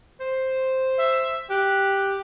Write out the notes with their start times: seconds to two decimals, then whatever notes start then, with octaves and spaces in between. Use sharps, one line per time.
0.20 C5
0.98 E5
1.50 G4 F#6